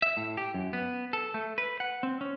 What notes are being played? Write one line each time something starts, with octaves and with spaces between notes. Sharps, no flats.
E5
A2
G4
F#2
B3
A4
A3
B4
F#5
C4
C#4